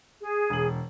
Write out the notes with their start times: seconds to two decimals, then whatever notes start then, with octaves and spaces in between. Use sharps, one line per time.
0.22 G#4
0.50 E1 F#7